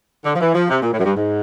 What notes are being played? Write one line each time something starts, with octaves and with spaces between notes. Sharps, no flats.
D3
F3
E3
F3
C3
A#2
A2
F#2
G2
G#2